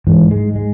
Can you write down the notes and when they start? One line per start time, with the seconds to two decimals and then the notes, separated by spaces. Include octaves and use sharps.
0.07 G#2 E3
0.31 G#3
0.55 G#3